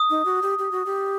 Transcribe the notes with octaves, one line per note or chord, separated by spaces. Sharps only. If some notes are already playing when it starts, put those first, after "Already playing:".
Already playing: D#6
D#4
F#4
G4
G4
F#4
G4